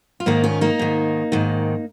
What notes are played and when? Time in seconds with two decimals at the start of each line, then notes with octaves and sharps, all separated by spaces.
0.20 F4
0.26 G#2 D#3 A#3 D#4
0.44 C#4 F4
0.61 A#3 D#4
0.79 G#2 D#3
1.32 G#2 D#3